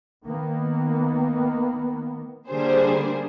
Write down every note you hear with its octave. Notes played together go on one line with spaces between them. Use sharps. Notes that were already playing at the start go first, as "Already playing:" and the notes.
D#3 A#3 B3
D3 G3 A#3 G#4 C5